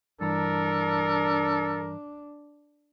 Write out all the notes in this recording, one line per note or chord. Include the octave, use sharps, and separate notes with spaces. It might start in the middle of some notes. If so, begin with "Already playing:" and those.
G2 E3 D4 A4 A#4 A#5